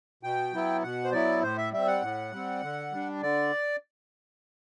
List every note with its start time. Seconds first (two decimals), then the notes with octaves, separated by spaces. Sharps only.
0.23 B2 G5
0.53 F#3 B3 E4
0.83 B2 F#5
1.04 C5
1.13 F#3 B3 E4 D5
1.43 A2 C5
1.58 E5
1.72 G3 C4 E5
1.87 F#5
2.02 A2
2.32 G3 C4
2.63 D3
2.92 G3 D4
3.22 D3 D5